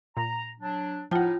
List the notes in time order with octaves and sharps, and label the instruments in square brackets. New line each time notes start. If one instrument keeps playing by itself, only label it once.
[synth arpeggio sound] A#2 [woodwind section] A#5
[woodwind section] F#3 D4
[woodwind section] A2 D#4 [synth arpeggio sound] F3 F#5 [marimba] F4 G5 A5